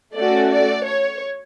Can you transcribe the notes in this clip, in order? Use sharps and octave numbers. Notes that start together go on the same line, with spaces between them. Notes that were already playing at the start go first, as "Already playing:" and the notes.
A3 C#4 F#4 A4 D5
D5
C#5